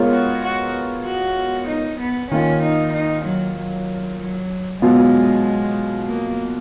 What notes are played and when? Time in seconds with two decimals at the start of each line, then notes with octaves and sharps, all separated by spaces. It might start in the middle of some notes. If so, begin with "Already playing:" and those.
Already playing: G#3 B3 F4 A#4 C#5
0.13 F#4
0.44 F#4
1.07 F#4
1.69 D#4
2.01 B3
2.31 D#3 A#3 C#4 F4
2.63 D#4
2.94 D#4
3.26 F#3
3.57 F#3
4.20 F#3
4.81 B2 F#3 G#3 B3 F4
6.07 A#3